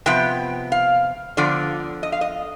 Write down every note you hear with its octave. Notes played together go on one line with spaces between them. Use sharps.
C3 F3 B3 G5
F5
D3 F3 B3 F4 D5
D#5
F5
D#5